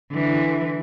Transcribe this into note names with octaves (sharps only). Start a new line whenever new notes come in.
D3 E3